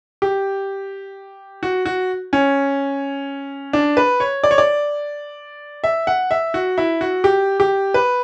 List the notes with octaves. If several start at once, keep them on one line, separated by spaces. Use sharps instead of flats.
G4
F#4
F#4
C#4
D4
B4
C#5
D5
C#5
D5
E5
F#5
E5
F#4
E4
F#4
G4
G4
B4